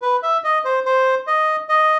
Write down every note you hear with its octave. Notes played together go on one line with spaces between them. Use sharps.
B4
E5
D#5
C5
C5
D#5
D#5